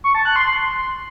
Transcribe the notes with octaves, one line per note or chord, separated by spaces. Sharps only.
C#6
A5
F#6
C6
C6